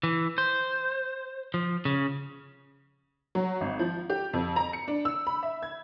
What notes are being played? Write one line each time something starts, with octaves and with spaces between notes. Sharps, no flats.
E3
C5
F3
C#3
F#3
G#1
F3
G4
F2
A#5
C#7
D4
E6
B5
E5
G#6